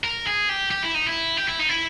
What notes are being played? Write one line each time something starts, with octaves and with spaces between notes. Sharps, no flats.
A#4
G#4
G4
G4
E4
D#4
E4
G4
E4
D#4
E4